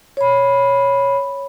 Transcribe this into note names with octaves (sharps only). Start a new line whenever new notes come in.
C#5 B5